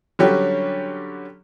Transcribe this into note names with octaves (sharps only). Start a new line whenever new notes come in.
D3 F#3 G3 C#4 F#4 G4